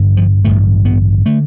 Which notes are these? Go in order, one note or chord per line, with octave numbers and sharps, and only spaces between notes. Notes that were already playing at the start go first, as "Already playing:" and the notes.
Already playing: A1 G2 D3
F3
A1 G2 D3 A3
B3
D3 A3